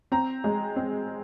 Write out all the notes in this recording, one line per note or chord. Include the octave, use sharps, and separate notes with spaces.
C4 A#5
G#3
C4